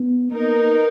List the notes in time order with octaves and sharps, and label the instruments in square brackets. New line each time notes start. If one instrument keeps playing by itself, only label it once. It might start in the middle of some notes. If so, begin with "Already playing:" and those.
Already playing: [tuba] B3
[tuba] A#3 [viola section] B3 D#4 A#4